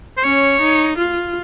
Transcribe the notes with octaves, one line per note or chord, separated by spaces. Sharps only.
C5
C#4 C#5
D#4
F4